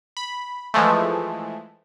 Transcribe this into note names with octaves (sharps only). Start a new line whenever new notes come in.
B5
E3 F3 G#3 A3